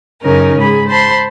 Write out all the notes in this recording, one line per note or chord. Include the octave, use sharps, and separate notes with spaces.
F#2 C#3 C#4 D#4 A#4
G#2 G#4 B5
C5 A5 B5 C6